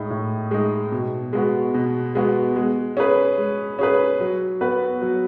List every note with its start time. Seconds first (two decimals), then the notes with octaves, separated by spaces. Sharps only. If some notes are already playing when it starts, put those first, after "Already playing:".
Already playing: A2 G#3 D#4
0.10 A2
0.51 G#3 D#4
0.92 B2
1.33 G#3 B3 F#4
1.74 B2
2.15 G#3 B3 F#4
2.56 G#3
2.97 C#4 G#4 B4
3.38 G#3
3.79 C#4 G#4 B4
4.20 F#3
4.61 B3 F#4 B4
5.02 F#3